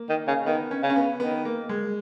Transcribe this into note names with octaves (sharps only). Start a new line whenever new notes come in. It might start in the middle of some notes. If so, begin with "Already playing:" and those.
Already playing: A#3
D#3
C#3
D#3 B3
C#4
C#3
C#4
B3
D#3 B3
A#3
G#3